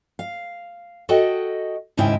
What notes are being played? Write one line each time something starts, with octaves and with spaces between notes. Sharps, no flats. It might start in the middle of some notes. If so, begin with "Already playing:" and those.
F5
F#4 A4 D#5 G5
D#2 G#2 C#3 D#4 E4 G5